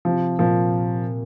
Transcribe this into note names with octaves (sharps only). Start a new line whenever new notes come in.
C3 F3
A#2 F3